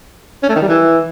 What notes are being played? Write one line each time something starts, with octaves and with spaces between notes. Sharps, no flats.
C#4
A3
D#3
G3
E3